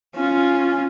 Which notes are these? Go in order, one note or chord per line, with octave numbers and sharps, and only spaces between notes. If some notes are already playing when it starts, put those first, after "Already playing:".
C#4 F4